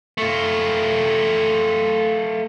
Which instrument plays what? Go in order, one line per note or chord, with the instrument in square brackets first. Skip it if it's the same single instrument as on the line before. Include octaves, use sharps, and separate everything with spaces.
[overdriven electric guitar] A3 F4